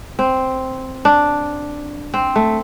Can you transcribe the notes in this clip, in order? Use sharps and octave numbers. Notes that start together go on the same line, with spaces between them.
C4
D4
C4
A3